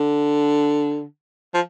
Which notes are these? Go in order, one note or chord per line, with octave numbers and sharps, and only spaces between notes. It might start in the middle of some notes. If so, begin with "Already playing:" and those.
Already playing: D3
F3